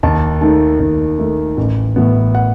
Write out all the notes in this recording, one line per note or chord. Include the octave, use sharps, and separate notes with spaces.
D#2 A5
D#3 A3 D#4 A5
D#2
D#3 A3 D#4
A1
A2 E3 B3
F#5